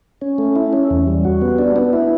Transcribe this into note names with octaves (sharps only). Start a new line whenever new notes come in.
C#4
A3
E4
C#4
E2
G3
F#4
B3
D4
B3
E4